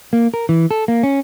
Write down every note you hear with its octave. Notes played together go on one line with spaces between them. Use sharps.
A#3
A#4
E3
A4
A#3
C#4